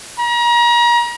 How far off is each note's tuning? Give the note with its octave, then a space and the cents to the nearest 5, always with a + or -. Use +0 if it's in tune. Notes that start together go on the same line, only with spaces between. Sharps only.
A#5 +35